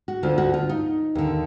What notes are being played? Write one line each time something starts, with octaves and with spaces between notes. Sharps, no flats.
F#4
D2 D3 F4
F#4
F4
D#4
D#2 D3